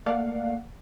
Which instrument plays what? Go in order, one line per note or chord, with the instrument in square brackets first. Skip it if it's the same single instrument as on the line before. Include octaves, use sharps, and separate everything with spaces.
[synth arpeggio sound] A3 A#3 D5 F5 F#5